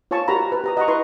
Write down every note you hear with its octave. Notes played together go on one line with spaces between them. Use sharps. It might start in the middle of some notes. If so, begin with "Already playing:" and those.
F4 C#5 G#5 A5 C#6
F#4 G4 A#4 A#5 B5
B4
G4 A#5 D#6
D#5 F#5 A#5 C#6
E4 B4 C6 C#6